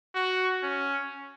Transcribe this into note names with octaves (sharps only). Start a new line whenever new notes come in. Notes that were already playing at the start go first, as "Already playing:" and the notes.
F#4
C#4